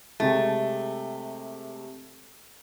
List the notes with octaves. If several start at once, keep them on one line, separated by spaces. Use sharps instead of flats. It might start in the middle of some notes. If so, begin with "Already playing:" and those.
C3 G#3 A3